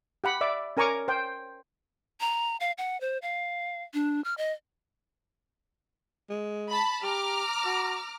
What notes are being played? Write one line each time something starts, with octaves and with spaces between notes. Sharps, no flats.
G4 F#5 B5
D5 E5 D6
C#4 A#4 G#5 A#5 C#6 D6
C5 G5
A#5
F5
F#5
C5
F5
D4
F6
D#5
G#3
A5 B5
G4 A#5 D6 F6
F#4